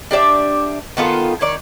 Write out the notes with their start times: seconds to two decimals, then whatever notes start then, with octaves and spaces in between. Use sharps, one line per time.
0.11 D4 G4 D5 E5
0.97 D#3 B3 F4 A4
1.41 D#3 C#5 D5